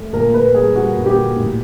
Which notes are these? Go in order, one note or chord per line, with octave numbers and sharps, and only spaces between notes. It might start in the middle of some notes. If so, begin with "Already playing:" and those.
Already playing: A3
A#2 A#4
A#2 B4
G3 G#4
G3 F#4
A#2 F#4
G4
A#2
A2